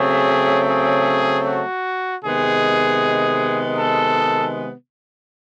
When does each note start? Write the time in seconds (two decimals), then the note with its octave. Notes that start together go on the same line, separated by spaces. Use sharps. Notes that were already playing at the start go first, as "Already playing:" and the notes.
Already playing: C#3 F#3 A3 C4 G#4
0.69 G#4
1.47 F#4
2.24 C3 D#3 G#3 B3 G#4
3.79 A4